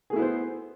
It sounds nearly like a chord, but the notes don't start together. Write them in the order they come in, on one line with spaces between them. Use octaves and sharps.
G#4 A3 E4 B3 C5